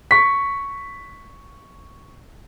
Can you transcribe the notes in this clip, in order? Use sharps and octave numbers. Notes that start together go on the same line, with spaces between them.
C#6 B6